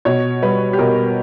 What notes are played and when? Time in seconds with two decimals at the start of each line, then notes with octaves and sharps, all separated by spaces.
0.05 B2 C#5
0.42 G3 B4
0.73 G4
0.78 B2 A#4